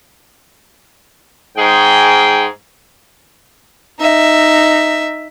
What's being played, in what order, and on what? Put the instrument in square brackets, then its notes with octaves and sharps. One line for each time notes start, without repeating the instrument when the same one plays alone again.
[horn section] G#2 G#4 G5
[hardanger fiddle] D#4 E5